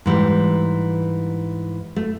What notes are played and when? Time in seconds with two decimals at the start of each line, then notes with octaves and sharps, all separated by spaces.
0.06 G#2 E3 G3
1.96 A3